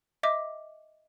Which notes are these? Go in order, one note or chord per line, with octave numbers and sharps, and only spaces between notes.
D#5 E5 D6